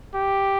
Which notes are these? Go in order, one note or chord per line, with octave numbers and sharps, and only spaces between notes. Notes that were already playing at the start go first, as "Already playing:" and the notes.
G4